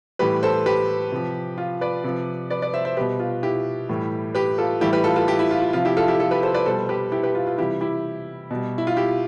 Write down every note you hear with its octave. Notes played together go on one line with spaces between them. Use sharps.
A2 E3 G3 G4 B4
A4 C5
G4 B4
C3 F3
F4
B4 D5
C3 F3
B4 D5
B4 D5
C5 E5
C5 E5
B2 G3 G4 B4
F4
E4 G4
A2 E3 G3
G4 B4
F4 A4
A2 E3 G3 E4 G4
G4 B4
F4 A4
F4 A4
E4 G4
E4
F4
F4
C3 F3 F4
E4 G4
F4 A4
E4 G4
F4 A4
G4 B4
A4 C5
B4 D5
B2 G3 A4 C5
G4 B4
E4 G4
G4 B4
F4
F4
C3 E3 G3 E4 G4
E4 G4
B2 G3
E4
F4
E4 G4